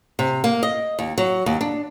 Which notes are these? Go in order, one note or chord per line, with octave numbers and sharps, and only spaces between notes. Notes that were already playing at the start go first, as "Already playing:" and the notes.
C3
A#3
D#5
D#2
F#3
D#2
D4